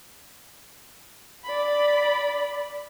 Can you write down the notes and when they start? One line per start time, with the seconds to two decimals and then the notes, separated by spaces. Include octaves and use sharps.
1.45 D5 B5